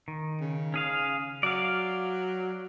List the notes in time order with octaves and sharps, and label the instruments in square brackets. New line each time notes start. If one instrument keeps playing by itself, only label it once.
[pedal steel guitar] D#3
[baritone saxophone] C#3
[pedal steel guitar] C#4 G#4 F5
[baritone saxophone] F#3 [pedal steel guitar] D5 F5